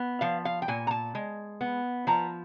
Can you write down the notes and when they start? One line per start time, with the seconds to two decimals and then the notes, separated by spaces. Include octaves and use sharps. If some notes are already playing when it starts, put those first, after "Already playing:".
Already playing: B3
0.21 F3 F5
0.45 F5
0.62 G5
0.68 A#2 G#5
0.87 A#5
0.91 A5
1.15 G#3
1.61 B3
2.07 F3 A#5